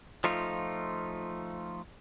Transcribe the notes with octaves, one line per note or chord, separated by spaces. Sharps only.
F3 A3 D#4 F4